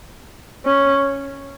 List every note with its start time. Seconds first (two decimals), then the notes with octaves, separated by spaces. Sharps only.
0.65 C#4